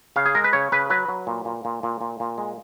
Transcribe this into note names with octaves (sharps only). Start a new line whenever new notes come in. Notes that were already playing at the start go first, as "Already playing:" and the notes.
C#3 F5
G#4
G#3 A#4
B4
C#3 C#5
C#3 B4
F#3 B4
F#3
A#2
A#2
A#2
A#2
A#2
A#2
G#3